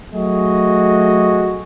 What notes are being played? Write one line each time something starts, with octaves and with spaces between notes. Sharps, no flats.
F#3 A3 F#4 G#4 D#5